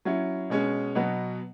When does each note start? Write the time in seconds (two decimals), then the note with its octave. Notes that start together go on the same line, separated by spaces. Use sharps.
0.05 F#3 C#4 E4
0.50 B2 G#3 C#4
0.95 B2 F#3 B3